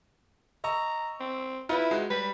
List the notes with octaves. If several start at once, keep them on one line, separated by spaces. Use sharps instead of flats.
D#5 A#5 C#6 E6
C4
E4 F4 B4
G#3 D#4 F#4
G3 B4